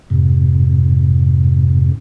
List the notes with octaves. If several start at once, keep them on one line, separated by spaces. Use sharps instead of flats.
F2 G#2 C3